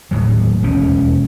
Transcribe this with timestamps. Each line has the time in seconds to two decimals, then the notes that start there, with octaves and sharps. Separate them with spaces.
0.11 D#1 A2 F#3
0.63 E1 D#2 C#4